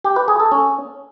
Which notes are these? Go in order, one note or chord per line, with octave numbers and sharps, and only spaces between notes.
G4
B4
G#4
A4
C#4